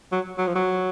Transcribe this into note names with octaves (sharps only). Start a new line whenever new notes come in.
F#3
F#3
F3
F#3